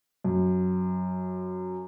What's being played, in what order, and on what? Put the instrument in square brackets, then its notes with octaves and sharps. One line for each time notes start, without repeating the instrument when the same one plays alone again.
[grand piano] F#2